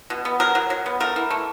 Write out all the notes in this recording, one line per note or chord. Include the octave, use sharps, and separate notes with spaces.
B2
B3
F#3 A#4
F#3
F#3
B3
A3 A#4
E3
A3